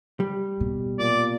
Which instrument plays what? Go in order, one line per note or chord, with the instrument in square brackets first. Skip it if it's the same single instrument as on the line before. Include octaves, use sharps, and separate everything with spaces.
[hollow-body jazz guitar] G3
[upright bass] B2
[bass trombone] A#2 [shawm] D5